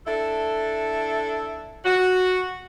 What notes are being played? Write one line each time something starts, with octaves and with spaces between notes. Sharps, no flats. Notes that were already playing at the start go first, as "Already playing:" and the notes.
D4 E4 A4
F#4